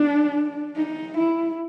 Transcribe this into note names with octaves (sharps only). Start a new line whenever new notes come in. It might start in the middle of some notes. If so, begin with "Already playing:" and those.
Already playing: D4
D#4
E4